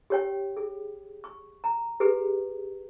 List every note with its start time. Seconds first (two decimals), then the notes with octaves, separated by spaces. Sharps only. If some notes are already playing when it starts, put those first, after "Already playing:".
0.10 G4 C#5 G5
0.57 G#4
1.24 C#6
1.64 A#5
2.00 G4 G#4 B4